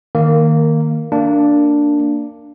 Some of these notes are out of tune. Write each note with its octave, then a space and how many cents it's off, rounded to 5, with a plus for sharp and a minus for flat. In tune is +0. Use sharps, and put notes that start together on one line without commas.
D#3 +0 A#3 -10
A#3 -20 D4 +0